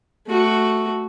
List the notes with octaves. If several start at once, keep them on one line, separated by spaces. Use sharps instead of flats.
A3 F#4